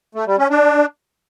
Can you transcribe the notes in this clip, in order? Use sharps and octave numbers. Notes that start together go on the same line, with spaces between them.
A3
G3
C#4
D4